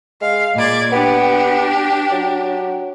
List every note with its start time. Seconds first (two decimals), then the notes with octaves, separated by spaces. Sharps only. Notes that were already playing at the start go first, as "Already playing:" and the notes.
0.21 G#3 F5
0.55 A#2 G#3 D5 G#6
0.92 B3 D4 G4
2.12 F#3